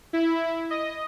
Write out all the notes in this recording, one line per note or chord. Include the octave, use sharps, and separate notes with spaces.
E4
D#5